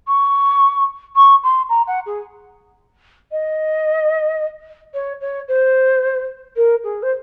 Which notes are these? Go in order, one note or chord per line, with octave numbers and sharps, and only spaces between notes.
C#6
C#6
C6
A#5
F#5
G#4
D#5
C#5
C#5
C5
A#4
G#4
C5